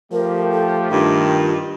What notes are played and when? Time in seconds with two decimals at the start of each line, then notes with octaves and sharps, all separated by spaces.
0.12 F3 A3 G4 A#4
0.52 A4
0.91 G2 D#3 F4